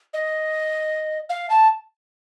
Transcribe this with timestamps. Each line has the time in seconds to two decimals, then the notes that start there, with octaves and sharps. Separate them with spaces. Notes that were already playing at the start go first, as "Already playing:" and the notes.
0.14 D#5
1.30 F5
1.50 A5